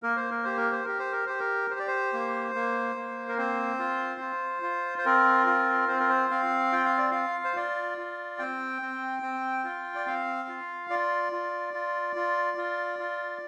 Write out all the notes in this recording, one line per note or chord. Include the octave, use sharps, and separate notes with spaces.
A#3 A#4
C5
A#4
G4 C5
A#4
C5
G4 A#4
C5
A#4
G4 C5
A#4
G4 C5
D5
C5
A#3
A#3
A#3
A#4
C4 C5
F4
F4
F4
C5
C4 A#4
F4
C4 C5
A#4
C5
C4 F5
F4 G5
F5
D5
F4 F5
C5
F4 D5
F4
C4 G5
C4
C4
F4
D5
C4 F5
F4
F4 D5
F4
F4
F4
F4
F4